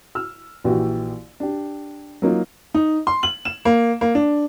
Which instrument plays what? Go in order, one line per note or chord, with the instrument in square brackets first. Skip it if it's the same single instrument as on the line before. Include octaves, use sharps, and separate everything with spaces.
[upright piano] E6 F6
A#1 E3 F#4 G4
D4 G4
F#3 A#3 D#4 F4
D#4
C6
F#7
E7
A#3
A#3
D4